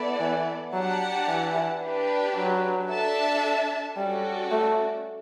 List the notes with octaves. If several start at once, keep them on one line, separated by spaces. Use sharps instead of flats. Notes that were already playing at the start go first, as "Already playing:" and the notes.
Already playing: B3 E4 A4 D5
E3
F#3 D4 G4 D5 F#5 A5
E3
D4 G4 B4
F#3
D4 A4 E5 A5
G3 C#4 F#4 A4 D5
A3